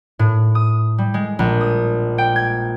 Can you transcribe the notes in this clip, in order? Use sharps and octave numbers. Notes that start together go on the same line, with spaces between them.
A2
D#6
G3
G#3
A#1
D#6
G5
G#6